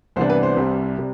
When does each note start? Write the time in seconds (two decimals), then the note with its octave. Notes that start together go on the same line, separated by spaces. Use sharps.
0.16 C2 C3 E3 B3 D4 C5
0.30 B4
0.43 C5
0.56 C2 C3 G3
0.98 C3 G3